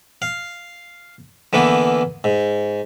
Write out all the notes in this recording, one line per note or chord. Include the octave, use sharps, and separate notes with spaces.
F5
D3 E3 A#3 B3
G#2